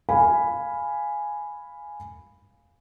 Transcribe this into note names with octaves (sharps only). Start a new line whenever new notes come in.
F5 G#5 B5